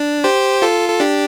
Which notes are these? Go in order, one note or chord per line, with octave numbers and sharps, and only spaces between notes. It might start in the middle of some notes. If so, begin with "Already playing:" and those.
Already playing: D4
G4 C5
F4 A4
A4
D4 G4